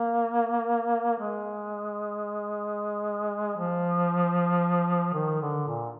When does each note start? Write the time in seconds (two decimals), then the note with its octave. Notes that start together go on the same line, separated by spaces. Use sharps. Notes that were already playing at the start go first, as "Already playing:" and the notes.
Already playing: A#3
1.19 G#3
3.57 F3
5.14 D#3
5.42 D3
5.68 A#2